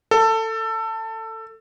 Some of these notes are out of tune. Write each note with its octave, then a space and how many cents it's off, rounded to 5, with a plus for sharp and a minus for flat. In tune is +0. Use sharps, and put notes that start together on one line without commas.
A4 +20